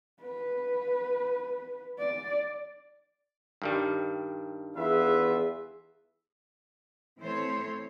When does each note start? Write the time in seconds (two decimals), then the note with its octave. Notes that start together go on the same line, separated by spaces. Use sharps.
0.22 B4
1.99 D5
3.62 G2 D#3 G3
4.76 E2 F4 G#4 B4 E5
7.20 E3 A3 C4 A4 C5 C#5